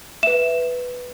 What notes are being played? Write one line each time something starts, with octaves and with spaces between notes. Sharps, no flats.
B4 E5 E7